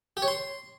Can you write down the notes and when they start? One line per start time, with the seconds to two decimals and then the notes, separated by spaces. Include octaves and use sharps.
0.17 G4
0.22 C#5
0.28 C6